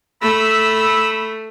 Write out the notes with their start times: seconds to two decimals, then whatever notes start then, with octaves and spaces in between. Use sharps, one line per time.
0.22 A3 B5 E6